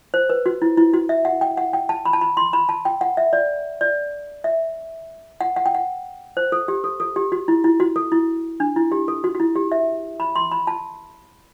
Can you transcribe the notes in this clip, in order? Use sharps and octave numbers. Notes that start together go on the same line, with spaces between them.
C5
B4
F#4
E4
E4
F#4
E5
F#5
G5
F#5
G5
A5
B5
A5
B5
C6
B5
A5
G5
F#5
E5
D5
D5
E5
F#5
F#5
G5
F#5
C5
A4
G4
A4
A4
G4
F#4
E4
E4
F#4
A4
E4
D4
E4
G4
A4
F#4
F#4
E4
G4
E5
B5
C6
B5
A5